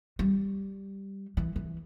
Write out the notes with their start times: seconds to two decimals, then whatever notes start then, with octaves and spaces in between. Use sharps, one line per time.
0.19 G3
1.37 E3
1.56 E3